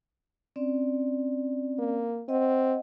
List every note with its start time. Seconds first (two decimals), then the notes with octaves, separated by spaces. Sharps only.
0.56 C4 C#4 D5
1.78 A#3
2.29 C4 D#5 F#5